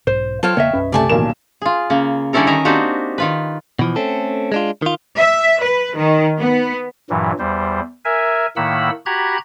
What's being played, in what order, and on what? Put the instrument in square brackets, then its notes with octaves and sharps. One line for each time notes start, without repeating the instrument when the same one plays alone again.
[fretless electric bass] B1 G#2 [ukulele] C5
[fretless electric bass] F#3 [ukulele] F4 C5 C#5 [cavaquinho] A4 F5 G5
[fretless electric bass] E1 C#3 A#3 [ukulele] C#5 D#5 E5
[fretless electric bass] B1 F#2 C#4 [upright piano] B4
[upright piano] C3 A3 [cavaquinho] D5 G#5 A5
[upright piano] D#1 B1 E7 [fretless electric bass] A2 E3 [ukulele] A#4
[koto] F4 G#4
C#3 A#3
D3 G3 C#4 E4 A4 A#4
D#3 D#5 E5 G#5 A#5
A#3 C4 D4 D#4 F#4 G4
D#3 F4 B4
[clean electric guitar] B2 E3 F3
A3 C4 C#4 A4
G#3 D4 F4
D#3 F4
[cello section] E5
B4
D#3
B3
[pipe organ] G2 A#2 E3 F#3
E2 G3 C5
A#4 E5 G#5
A2 D#3 A#3 F#5 B5 E6
F#4 G4 A#5 B5 F#6 G#6